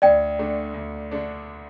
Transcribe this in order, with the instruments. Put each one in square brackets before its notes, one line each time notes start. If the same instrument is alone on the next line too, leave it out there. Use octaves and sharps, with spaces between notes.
[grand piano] D2 [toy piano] D5 G5
[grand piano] D3 A3 D4
D2
D3 A3 D4